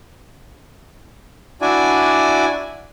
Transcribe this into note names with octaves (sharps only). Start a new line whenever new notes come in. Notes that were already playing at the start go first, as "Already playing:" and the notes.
D4 E4 F#4 D5 G#5